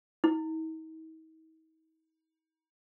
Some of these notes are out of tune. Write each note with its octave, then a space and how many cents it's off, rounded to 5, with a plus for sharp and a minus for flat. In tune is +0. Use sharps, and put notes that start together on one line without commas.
D#4 +45